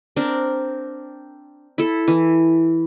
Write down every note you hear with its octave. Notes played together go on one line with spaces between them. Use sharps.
C4 D4 A#4
E4 A4
E3